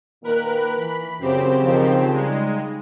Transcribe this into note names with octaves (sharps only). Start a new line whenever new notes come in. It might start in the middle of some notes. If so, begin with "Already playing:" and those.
A#2 D#3 A#3 A#4 B4 F#6
E3 B5
F#2 C#3 C4 G4 C5
D#3 F3
G3 G#3 D#4